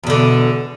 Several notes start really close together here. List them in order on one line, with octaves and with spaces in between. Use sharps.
E2 B2 D3